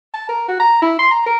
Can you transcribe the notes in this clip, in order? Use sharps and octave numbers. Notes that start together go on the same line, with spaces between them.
A5
A#4
F#4
A#5
E4
C6
A#5
A#4